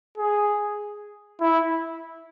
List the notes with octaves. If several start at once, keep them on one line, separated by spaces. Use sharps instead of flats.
G#4
E4